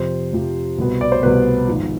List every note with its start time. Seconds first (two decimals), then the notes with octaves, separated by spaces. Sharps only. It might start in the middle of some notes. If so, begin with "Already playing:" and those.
Already playing: F2 C3 F3 C5
0.33 F2 C3 F3
0.78 C2 B2 B3
1.01 D5
1.12 C5
1.23 C2 B2 B3 B4
1.68 G#1 G#2 F3